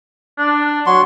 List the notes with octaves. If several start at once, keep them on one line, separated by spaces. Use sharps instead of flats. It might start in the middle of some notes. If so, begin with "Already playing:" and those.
D4
F#3 C6 C#6